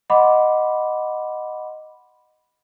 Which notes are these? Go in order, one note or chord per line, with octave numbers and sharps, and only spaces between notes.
D#5 F#5 B5 C6 D6